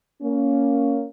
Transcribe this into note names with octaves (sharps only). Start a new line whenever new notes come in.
A#3 C#4